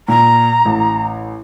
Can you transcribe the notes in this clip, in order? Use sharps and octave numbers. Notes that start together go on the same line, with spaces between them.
A#2 A#5
A1